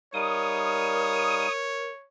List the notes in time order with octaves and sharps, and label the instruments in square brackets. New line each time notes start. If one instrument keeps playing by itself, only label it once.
[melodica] G3 D#4 F5 [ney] A#4 [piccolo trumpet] C#5 [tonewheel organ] D#6